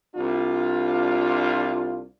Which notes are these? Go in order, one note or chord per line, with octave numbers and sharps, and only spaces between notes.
C2 D4 F4